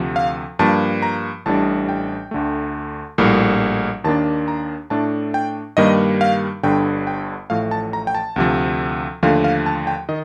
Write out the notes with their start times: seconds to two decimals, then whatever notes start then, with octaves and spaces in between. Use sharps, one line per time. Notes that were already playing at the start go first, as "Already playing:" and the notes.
Already playing: D2 C3 F3
0.16 F5
0.59 G2 F3 A#3 A5
1.02 A#5
1.46 A1 A2 G3 D4 A5
1.89 G5
2.31 D2 D3 A3
3.18 A#1 A2 G3 A#3
4.04 D#2 D#3 A#3 D4 A5
4.48 A#5
4.90 A2 A3 D4 A5
5.34 G5
5.77 G2 D#3 G3 A#3 D#5
6.21 F5
6.63 G1 G2 D3 G5
7.07 G5
7.50 A1 A2 F3 A3 F5
7.71 A5
7.93 A#5
8.07 G5
8.15 A5
8.36 D2 C3 F3
9.23 D#2 D3 F3 A3 F5
9.44 F5
9.66 A5
9.87 G5
10.09 D#3 D#5